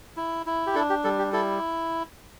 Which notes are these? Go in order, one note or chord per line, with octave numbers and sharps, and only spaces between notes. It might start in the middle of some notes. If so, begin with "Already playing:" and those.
E4
E4
G4
D4 A4
G4
G3 A4
G4
E4 A4